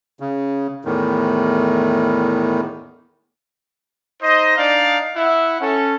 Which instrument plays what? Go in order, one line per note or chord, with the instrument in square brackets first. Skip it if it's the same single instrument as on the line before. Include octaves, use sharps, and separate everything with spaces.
[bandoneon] C#3
E2 A2 D#3
[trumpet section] D#4 C5 D#5
D4 D#4 D5 F5
E4 E5 F#5
C#4 A4